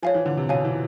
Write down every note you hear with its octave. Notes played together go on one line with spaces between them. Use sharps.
F3 C#5 F5 G#5
E3
D3
C3
B2 C#5 F5 G#5
E3